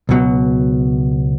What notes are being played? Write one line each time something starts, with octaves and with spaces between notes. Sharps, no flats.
C#2 B2 F#3